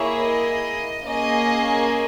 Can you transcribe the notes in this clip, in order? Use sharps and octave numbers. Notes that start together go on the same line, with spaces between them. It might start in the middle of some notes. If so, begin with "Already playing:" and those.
Already playing: A#3 E4 G#4 C#5
D#5
A#3 C#4 G#4 D#5